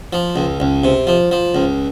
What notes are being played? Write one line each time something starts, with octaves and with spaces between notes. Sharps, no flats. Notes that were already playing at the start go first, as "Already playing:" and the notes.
F3
C#2
C#2
C3
F3
F3
C#2